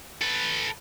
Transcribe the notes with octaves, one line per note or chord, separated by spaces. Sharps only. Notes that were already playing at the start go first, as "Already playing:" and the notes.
A4 B4